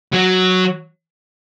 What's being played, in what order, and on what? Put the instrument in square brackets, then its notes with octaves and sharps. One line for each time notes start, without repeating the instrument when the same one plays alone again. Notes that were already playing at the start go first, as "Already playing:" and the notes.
[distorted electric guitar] F#3